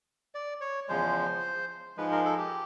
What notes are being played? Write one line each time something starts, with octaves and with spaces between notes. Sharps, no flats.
D5
C#5
E2 C#3 F3 G#3 C5
G#2 F3 G#3 B4
A#4
A4
G4